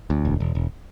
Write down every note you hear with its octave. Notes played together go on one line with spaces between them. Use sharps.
D2
E1
E1
E1